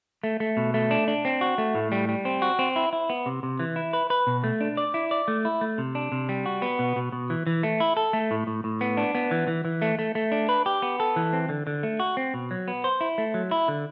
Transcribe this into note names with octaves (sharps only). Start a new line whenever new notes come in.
A3
A3
B2
A3
D4
D4
C4
F#4
A3
A2
G3
G3
C4
F#4
C4
E4
E4
B3
C3
C3
E3
E4
B4
B4
B2
A3
D4
D5
E4
D5
A3
E4
A3
C3
D4
C3
G3
F#4
B3
B2
B2
B2
E3
E3
A3
E4
A4
A3
A2
A2
A2
B3
D4
B3
E3
E3
E3
A3
A3
A3
D4
B4
G4
B3
A4
E3
C4
D3
D3
A3
F#4
C4
B2
F#3
B3
C5
E4
A3
F#3
E4
D3